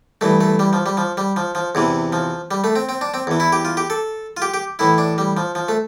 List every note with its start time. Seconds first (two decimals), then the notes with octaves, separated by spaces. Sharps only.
0.21 G2 E3 A3
0.41 A3
0.59 G3
0.73 F3
0.86 G3
0.97 F3
1.17 G3
1.36 F3
1.55 F3
1.75 E2 C3 E3
2.13 F3
2.51 G3
2.64 A3
2.76 C4
2.89 C4
3.01 D4
3.14 C4
3.27 E2 E3
3.40 E4
3.52 G4
3.65 F4
3.77 G4
3.90 A4
4.37 F4
4.42 G4
4.54 G4
4.79 A2 E3 E4
4.98 D4
5.18 G3
5.37 F3
5.55 F3
5.68 A3